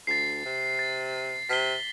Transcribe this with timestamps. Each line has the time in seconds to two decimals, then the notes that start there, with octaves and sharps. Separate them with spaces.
0.07 D2 A6 C7
0.45 C3
0.79 A6
1.49 C3 B6 G7